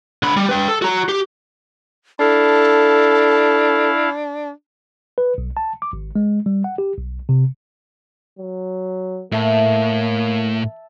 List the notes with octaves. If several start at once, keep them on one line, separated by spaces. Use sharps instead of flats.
D3 B5
G3
B4 G5
A4
F#4 A#5
G4
D4 E4 A4 F5
B4
B1
A5
D6
G#1
G#3
G3
F#5
G4
B1
C3
F#3
A2 A#3 E5 A5